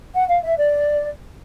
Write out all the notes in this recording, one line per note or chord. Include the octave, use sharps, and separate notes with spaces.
F#5
F5
E5
D5